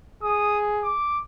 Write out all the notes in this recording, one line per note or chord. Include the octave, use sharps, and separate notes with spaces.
G#4 D#6
D6